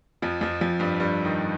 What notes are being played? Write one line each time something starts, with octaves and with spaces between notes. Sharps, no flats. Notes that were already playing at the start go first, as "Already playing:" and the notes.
F2 F3
F2 F3
F2 F3
G2 G3
G2 G3
D#3 D#4